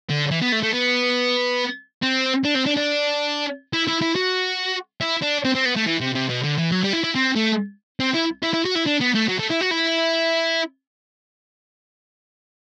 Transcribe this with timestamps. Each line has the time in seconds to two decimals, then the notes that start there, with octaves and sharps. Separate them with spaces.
0.09 D3
0.31 E3
0.42 B3
0.52 A3
0.63 A3
0.73 B3
2.02 C4
2.45 D4
2.55 C4
2.66 D4
2.77 D4
3.73 E4
3.87 E4
4.01 E4
4.15 F#4
5.01 E4
5.22 D4
5.44 C4
5.55 C4
5.65 B3
5.76 A3
5.87 E3
6.01 C3
6.15 C3
6.30 B2
6.43 D3
6.58 E3
6.72 F#3
6.83 G3
6.93 E4
7.04 E4
7.15 C4
7.36 A3
8.00 C4
8.14 E4
8.43 E4
8.53 E4
8.65 F#4
8.75 E4
8.86 D4
9.00 B3
9.14 A3
9.28 F#3
9.39 A3
9.50 E4
9.61 F#4
9.71 E4